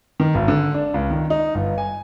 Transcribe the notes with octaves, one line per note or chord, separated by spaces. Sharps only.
D#3
G#1
D3
D4
C#2
D#3
D#4
G1
G#5